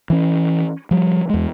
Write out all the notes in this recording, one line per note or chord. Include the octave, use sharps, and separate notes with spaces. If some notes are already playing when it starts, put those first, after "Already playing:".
E3 C#4
F3 G3
E2 G#3